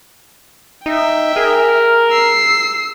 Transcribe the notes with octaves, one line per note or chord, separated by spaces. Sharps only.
D#4 E5 G5
G#4 A#4
E6 C7